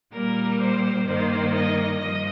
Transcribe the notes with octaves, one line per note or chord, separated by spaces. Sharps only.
A#2 G3 A#3 A#4
C5
G2 D#3 A#3 C5
D#5
G2 F3 D#5